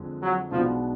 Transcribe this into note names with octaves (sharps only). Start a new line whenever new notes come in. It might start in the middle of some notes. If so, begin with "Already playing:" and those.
Already playing: F2 D3 G#3
F#3
B1 B2 F3 G#3 B3 D4